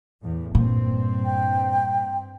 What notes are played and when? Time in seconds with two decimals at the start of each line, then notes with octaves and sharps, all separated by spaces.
0.22 E2 A2
0.55 G2 A#2 C4
1.25 G5